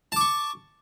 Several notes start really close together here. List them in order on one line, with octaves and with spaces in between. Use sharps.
A5 D6 C#6